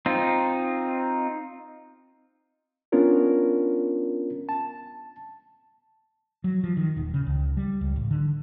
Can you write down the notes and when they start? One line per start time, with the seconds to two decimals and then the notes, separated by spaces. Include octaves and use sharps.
0.06 C4 D#4 F4
2.92 B3 C#4 D4 F4 A#4 C#5
4.49 A5
6.44 F#3
6.64 F3
6.77 D#3
6.96 D#1
7.14 C#3
7.26 C#2
7.57 G3
7.81 C#2
7.96 A1
8.11 D3